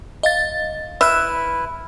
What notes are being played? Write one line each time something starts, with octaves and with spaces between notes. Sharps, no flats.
D#5 F5 A6
E4 B4 E5 B5 F6 F#6